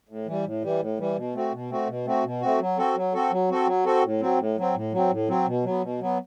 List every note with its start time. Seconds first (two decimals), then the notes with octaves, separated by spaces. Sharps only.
0.09 A2
0.27 E3 G3
0.45 A2
0.63 E3 G3
0.80 A2
0.99 E3 G3
1.16 B2
1.34 A3 C4 F#4
1.53 B2
1.71 A3 C4 F#4
1.88 B2
2.06 A3 C4 F#4
2.24 B2
2.42 A3 C4 F#4
2.60 F#3
2.78 C4 F#4 A4
2.96 F#3
3.14 C4 F#4 A4
3.32 F#3
3.50 C4 F#4 A4
3.67 F#3
3.85 C4 F#4 A4
4.03 A2
4.21 F#3 C4
4.39 A2
4.57 F#3 C4
4.75 A2
4.93 F#3 C4
5.11 A2
5.29 F#3 C4
5.46 B2
5.64 F#3 B3
5.82 B2
6.00 F#3 B3